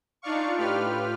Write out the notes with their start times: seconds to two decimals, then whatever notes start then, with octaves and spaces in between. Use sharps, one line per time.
0.22 D4 D#4 F4 D5 F5 C#6
0.58 A2 F4 G4 B4 F6